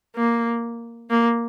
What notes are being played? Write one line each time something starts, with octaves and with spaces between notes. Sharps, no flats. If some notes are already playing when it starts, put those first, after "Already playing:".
A#3
A#3